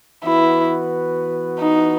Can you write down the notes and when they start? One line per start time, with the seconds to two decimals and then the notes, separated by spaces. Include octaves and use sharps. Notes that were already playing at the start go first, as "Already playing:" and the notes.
0.25 E3 B3 E4 F#4 B4
1.60 D#4